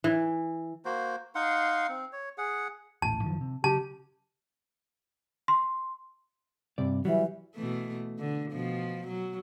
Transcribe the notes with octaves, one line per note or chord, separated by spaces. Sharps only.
E3
A#3 F#4 C5
D#4 F5 F#5 C6
C4
C#5
G#4 F#5
D#1 A1 A2 A5
F#2 D#3 F3
C3
C#3 F#3 G4 A5
C6
G2 C3 D5
E3 F#3 G3
B2 E3 A3
D3
B2 F3
F#3